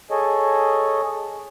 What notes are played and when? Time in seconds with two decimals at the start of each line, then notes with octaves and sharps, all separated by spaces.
0.11 G#4 A4 C#5 D#5